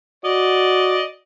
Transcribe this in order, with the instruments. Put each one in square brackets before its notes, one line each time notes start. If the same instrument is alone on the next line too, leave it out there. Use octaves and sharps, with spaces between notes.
[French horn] F#4 [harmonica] D5 D#5